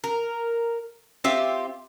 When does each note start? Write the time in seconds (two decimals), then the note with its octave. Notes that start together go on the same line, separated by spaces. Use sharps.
0.04 A#4
1.24 C4 F4 G4 E5